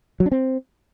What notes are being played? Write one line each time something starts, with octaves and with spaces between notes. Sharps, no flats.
F#3
D4
C4